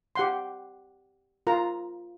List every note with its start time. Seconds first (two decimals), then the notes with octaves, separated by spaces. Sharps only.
0.16 G4 F#5 C6
1.47 F4 A#4 A#5